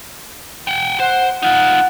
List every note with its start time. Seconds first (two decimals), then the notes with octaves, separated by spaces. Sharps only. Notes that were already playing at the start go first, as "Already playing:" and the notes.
0.67 F#5 G5
1.00 C5 F#5
1.42 D#4 F4 F#5